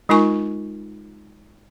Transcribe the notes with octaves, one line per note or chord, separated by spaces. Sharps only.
G#3 D#4 F4 A#4 G#5 C#6